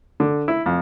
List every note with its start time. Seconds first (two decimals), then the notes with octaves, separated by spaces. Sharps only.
0.20 D3
0.48 E4
0.66 F2